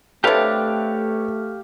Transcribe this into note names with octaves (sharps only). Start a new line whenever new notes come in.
C3 A3 D4 G4 A4 B4 C#5 F5